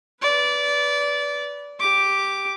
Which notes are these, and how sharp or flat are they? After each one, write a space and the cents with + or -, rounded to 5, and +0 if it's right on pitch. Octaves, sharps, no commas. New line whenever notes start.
B4 +0 D5 -20
G4 +0 D6 +0